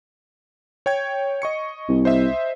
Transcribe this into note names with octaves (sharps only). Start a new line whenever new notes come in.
C#5 G5 G#6
D#5 C#6 C#7
C2
C5 D#5 E5